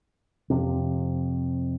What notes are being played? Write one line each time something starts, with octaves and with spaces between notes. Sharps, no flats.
F2 C3